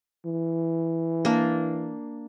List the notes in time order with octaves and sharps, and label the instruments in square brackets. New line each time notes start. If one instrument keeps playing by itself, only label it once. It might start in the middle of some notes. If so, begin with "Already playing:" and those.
[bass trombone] E3
[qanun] A#3 D4